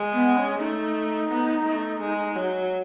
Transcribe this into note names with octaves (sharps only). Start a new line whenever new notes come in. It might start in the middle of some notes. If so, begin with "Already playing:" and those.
Already playing: G#3
B3
C#4
A3 D#4
B3
A3
G#3
F#3